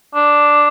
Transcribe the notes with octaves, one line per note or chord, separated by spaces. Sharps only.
D4